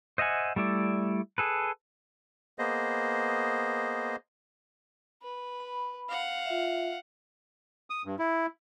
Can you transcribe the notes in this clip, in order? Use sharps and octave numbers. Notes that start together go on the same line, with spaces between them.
C5 D#5 E5 F#5 G#5
G3 A3 E4 D5
G#4 A4 B4
A#3 B3 G#4 C5 D#5
B4
B5
F5 F#5
F4 E5
D#6
G2
E4